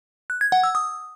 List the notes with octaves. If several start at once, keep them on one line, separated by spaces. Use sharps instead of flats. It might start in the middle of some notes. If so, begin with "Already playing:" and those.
F#6
G#6
F#5
E6
D#6